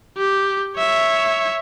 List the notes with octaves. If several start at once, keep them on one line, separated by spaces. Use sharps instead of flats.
G4
C#5 E5